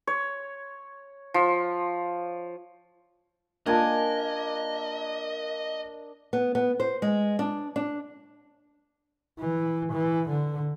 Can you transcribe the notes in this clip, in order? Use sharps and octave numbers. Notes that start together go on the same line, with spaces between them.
C#5
F3
A#3 D4 F4 A#4 D#5 G#5 A5
B3
B3
C5
G#3
D4
D4
E3
E3
D3